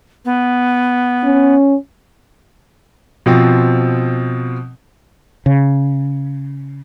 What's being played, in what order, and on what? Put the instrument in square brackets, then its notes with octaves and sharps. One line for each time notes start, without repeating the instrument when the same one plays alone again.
[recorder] B3
[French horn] C#4
[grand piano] B2 F3 C4
[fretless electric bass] C#3